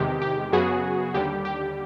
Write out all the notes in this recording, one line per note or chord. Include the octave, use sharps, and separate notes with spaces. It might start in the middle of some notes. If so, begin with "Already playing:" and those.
Already playing: E2 C3 D#3 G#3 G4
G4
F#2 C#3 F#3 B3 F#4 G#4
D#2 D3 G3 G4
G4